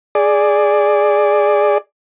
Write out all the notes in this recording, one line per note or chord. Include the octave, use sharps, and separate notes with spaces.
G#4 D5